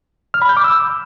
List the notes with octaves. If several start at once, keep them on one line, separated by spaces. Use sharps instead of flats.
F6
B5
G6
D6
E6